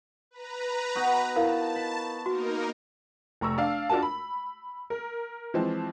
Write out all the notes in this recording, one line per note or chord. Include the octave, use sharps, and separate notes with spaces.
B4 A#5
B3 D#4 F#4
E4 A#4 F5 A5
B5
A#3 D#4 F#4 A#4
F1 A#5 C#6 E6
D4 F5
D4 F4 F#4 A#4 A5
B5
A#4
E3 F3 G#3 C4